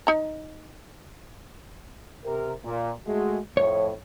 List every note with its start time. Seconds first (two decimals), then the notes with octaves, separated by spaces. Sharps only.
0.07 D#4 A#5
2.24 C3 A#4
2.63 A#2
3.06 G#3 A3 F#4
3.57 F2 A2 C#5